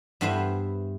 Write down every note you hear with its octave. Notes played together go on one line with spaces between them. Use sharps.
G2 B3 E4 C5 E5